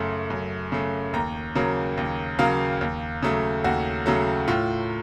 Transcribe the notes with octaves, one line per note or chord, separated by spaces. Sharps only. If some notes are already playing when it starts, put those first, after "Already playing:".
Already playing: F#2 C#3 A3 C6
F#2
C#3 A3
D#2 A#5
C#3 F#3 A#3
D#2
C#3 F#3 A#3 F5
D#2
C#3 F#3 A3
D#2 F#4
C#3 F#3 A3
A2 F4